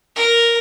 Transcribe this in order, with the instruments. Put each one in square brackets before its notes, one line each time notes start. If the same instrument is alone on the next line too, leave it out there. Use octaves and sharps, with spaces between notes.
[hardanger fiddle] A#4